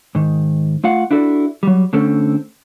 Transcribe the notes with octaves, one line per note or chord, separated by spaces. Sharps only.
G#2 D#3
A3 F4 F5 F#5
D4 E4 F#4 A4 B4 D5
F#3 G3
D3 A3 C4 C#4 A4